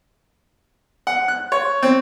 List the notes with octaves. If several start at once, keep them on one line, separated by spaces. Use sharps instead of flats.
F#5
F#6
C#5
C4